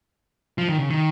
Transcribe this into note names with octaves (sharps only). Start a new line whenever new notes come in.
F3
D#3
C#3
D#3